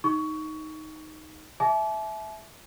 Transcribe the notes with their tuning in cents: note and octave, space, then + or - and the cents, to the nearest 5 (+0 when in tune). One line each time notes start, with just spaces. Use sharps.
D#4 +5 C#6 +20
E5 +0 A5 -45 D6 -25